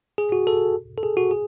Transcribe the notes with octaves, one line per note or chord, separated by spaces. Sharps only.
G#4
F#4
A4
A4
G#4
F#4
G#4